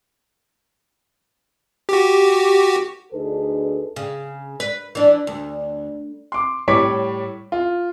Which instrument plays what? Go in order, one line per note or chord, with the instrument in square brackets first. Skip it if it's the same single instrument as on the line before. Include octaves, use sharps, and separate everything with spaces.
[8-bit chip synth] F#4 G4
[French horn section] D2 D4 D#4 G#4 A4 B4
[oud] C#3
B4
E3 D4
D2
[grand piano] C6 D6
A2 G3 C#5 C#6 D6 B6
F4